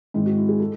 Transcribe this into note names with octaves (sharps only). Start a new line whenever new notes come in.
G#2 D#3 G#3 C4 E4
F#4
E4
G#4
A4